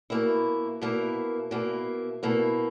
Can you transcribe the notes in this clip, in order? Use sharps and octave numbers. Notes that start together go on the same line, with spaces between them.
B2 A#3 E4
B2 A#3 E4
B2 A#3 E4
B2 A#3 E4